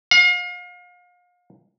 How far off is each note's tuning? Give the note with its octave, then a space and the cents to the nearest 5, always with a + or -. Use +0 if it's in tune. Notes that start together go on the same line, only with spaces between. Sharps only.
F5 +35